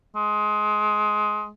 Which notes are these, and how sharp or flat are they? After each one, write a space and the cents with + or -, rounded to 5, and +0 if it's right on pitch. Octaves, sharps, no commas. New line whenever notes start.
G#3 +20